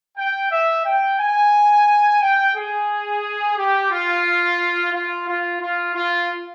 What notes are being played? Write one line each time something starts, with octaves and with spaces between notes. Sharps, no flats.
G5
E5
G5
G#5
G5
G#4
G4
F4
F4
F4
F4
F4